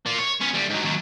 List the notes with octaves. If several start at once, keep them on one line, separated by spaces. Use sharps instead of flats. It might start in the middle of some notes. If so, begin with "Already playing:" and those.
A#3 F4
C#5
B3 C#4
D2 G3
G#2 F#3
D#2 F#3